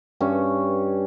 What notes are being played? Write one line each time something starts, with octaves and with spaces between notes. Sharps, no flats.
G2 C#4